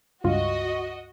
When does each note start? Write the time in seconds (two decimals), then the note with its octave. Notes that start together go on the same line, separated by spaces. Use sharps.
0.24 C#2 G2 F4 F#4 D#5